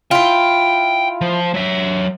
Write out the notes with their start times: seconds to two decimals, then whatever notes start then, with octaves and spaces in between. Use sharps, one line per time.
0.11 E4 F4 G5
1.21 F3
1.54 F#3 E5